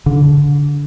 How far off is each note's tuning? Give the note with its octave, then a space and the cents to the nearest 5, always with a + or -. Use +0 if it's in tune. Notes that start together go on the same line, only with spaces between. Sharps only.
D3 -25